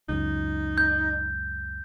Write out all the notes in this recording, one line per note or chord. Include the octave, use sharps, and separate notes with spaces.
C#2 F#2 D#4
G6